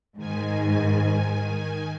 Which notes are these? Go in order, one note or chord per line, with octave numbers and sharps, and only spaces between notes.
G#2 D#3 G#5